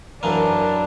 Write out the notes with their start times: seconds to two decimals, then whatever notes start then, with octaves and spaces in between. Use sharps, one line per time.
0.23 F#2 E3 A#3 D4